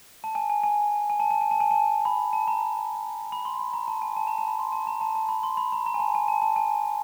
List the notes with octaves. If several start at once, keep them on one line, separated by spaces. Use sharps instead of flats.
A5
G#5
G#5
G#5
G#5
A5
A5
G#5
A5
G#5
A5
B5
A5
A#5
B5
C6
B5
A#5
A5
G#5
A5
A#5
A5
B5
C6
A5
A#5
A5
A5
B5
C6
B5
A#5
A#5
G#5
A5
G#5
A5
A5
G#5